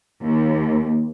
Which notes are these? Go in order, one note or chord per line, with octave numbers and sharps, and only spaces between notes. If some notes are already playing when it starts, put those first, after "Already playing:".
D#2